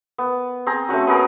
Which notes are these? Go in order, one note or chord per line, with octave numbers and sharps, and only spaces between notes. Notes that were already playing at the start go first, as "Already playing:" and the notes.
B3
C4 G#4 A#5
A3 C4 C#4 F#4
B3 G#4 A#4 A#5